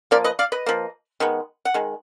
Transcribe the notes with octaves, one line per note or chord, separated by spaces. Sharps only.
F3 A#3 A#4 D5
B4 D#5
D5 F5
B4 D#5
F3 A#3
D#3 G#3 B3
F#5
D#3 G#3